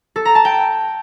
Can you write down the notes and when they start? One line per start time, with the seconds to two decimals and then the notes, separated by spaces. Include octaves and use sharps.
0.16 A4
0.25 A#5
0.35 A5
0.45 G5